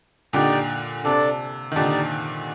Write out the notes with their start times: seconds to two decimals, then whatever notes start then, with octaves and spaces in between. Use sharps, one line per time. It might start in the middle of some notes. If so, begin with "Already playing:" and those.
0.33 A#2 D3 D#4 G4 D5 G5
1.04 C3 D4 A4 D5
1.72 D#3
1.76 A#2 D3 D#4 G4 D5 A5